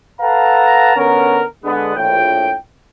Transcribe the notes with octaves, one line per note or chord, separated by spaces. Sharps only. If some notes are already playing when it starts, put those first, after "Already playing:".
A4 B4 F5 F#5 A5 A#5
D3 B3 C#4 A#4
D3 G#3 B3
A#1 A2 G5